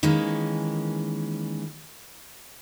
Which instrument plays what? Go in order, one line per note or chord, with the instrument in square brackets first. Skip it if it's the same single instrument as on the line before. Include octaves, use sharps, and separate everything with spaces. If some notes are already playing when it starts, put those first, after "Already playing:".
[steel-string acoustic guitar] D#3 E3 G#3 A#3 C#4